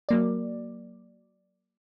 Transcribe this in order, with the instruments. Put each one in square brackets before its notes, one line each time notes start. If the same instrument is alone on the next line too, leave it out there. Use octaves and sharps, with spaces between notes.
[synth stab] F#3 A#3 D5